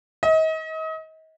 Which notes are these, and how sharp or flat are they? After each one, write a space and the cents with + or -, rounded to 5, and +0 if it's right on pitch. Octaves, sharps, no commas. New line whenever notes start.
D#5 +35